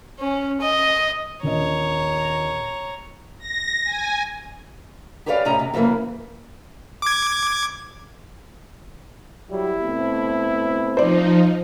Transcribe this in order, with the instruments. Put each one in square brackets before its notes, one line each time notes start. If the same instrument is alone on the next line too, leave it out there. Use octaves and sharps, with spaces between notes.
[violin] C#4
D#5
[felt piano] D#1 D4 D#5 [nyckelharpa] C#5 A#5
[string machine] A#6
G#5
[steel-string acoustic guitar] G4 G#4 B4 C#5 D5 F5
A2 C3 C#4 G#4 D#5 A#5
C3
F2 C#3 E3 G3 A#3
[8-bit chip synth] D6 G#6
[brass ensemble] F#3 G3 [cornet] E4
[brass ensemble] B2 A3 C4
[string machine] F3 D#4 [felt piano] C5 D5